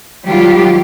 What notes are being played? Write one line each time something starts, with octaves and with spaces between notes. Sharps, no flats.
D#3 F#3 G3 F4 G4